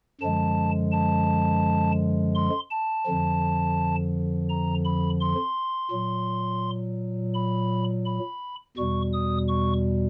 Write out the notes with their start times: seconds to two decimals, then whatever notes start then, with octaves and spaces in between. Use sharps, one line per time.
0.21 F#2 D3 F3 G#3 A5
0.92 A5
2.35 C6
2.71 A5
3.07 F2 D3 F3
4.49 A#5
4.85 B5
5.20 C6
5.91 A#2 F#3
7.34 B5
8.05 B5
8.77 E2 B2 G3 C#6
9.13 D#6
9.48 C#6